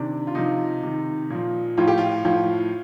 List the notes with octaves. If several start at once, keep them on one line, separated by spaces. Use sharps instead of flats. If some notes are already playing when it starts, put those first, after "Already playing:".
Already playing: C3 D#3 D4
F4
C3 F3 D#4
C3 D#3
A#2 F3
A2 F3 F4
G4
F4
A2 F3